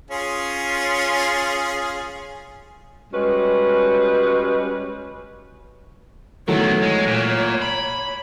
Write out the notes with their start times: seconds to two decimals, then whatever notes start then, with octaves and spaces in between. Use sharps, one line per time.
0.11 C#4 F4 G#4
3.13 G3 G#3 C#4 F#4 B4
6.48 D#3 E3 F#3 A3 B3 C#5
6.82 G#3
7.07 A#2
7.62 B5